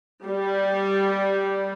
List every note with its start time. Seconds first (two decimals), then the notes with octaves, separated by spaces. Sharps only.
0.25 G3